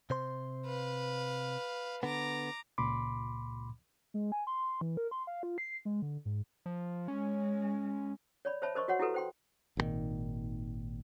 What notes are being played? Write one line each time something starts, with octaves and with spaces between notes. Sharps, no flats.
C3 C5 C6
B4 F5
D3 B3 A#5 D6
C#2 A#2 B5 C6 D6
G#3
G#5
C6
E3
A#4
C6
F5
F4
C7
G#3
D3
G#2
F3
G#3 C#4
C#5 D5 B5
C5 C#5 E5 A5 B5
A#4 C5 D#5 C6 C#6
F#4 C#5 F#5 C6
E4 F#4 G4 A4 B4
C5 G5 C6
G#1 G2 A#2 D#3